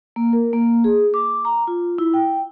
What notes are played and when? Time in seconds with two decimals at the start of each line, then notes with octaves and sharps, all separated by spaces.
0.16 A#3
0.33 A#4
0.53 A#3
0.84 G#4
1.14 D6
1.45 A#5
1.67 F4
1.98 E4
2.14 G5